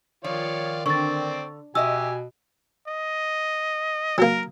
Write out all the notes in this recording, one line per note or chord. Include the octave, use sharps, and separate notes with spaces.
D#3 F3 F4 C#5 D5
D3 C4 D5 C#6 A6
B2 F#4 G4 D#5 E5 G#5 E6
D#5
F#3 A#3 A#4